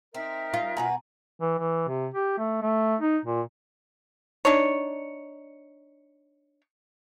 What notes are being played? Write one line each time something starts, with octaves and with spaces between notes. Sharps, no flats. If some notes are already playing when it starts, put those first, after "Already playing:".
C4 D#4 A#4 E5
F4
B2 F#4 B4 G#5 A#5
E3
E3
C3
G4
A3
A3
D#4
A#2
D4 D#4 C#5